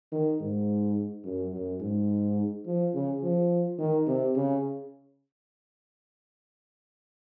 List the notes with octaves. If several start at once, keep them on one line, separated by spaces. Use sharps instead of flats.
D#3
G#2
F#2
F#2
G#2
F3
C#3
F3
D#3
C3
C#3